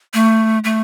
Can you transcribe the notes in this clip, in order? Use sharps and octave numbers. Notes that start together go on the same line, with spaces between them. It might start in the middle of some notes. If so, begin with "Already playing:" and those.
A3
A3